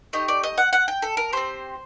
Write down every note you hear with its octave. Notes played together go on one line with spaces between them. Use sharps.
A3 D#4 G4 D#5
D5
D#5
F#5
F#5
G5
A4
A#4
C4 G4 C5